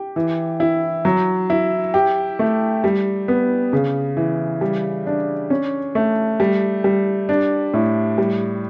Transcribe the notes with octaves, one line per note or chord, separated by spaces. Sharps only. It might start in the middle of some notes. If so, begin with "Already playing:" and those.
Already playing: G4
E3
E4
F#3
E4
G4
A3
G3
B3
C#3
E3
G3
D4
C#4
A3
G3
G3
D4
A2
G3